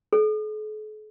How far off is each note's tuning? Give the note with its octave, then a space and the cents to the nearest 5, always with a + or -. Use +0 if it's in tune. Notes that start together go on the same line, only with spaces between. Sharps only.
A4 -45